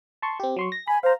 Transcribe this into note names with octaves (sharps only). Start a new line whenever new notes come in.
A5 C6 C#6
C4 G4
F#3 C6 C#6
A#6
G#5 B5
C5 F5 A#5